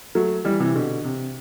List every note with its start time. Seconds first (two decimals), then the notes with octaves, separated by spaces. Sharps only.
0.15 F#3 A3
0.45 E3 G3
0.60 C3 E3
0.75 B2 D3
1.04 C3